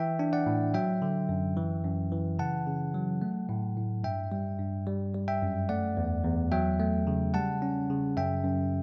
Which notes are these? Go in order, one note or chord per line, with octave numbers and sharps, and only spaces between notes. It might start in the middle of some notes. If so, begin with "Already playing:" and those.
Already playing: E3 E5 G5
D4
D5 F#5
A2
F#3 E5 G5
D3
F#2
E3
F#2
E3
C#3 F#5 A5
C#3
F#3
A3
A2
A2
G2 E5 G5
G3
G2
G3
G3
E5 G5
F#2
A3 D5 F#5
E2
E2
F#3 E5 G5
A3
C#3
G3 F#5 A5
C#4
C#3
F#2 E5 G5
F#2